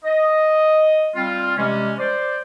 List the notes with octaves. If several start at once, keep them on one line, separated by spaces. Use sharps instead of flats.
D#5
G3 C4 F4
C3 E3 G3 G#3 C#4
C5 D5